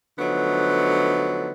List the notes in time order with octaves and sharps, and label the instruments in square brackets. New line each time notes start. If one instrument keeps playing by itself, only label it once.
[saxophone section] D3 F3 F#3 A3 B3 D#4